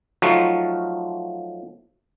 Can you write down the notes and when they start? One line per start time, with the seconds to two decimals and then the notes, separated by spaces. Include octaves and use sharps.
0.22 F3 F#3 A3 D#4 F4 F#4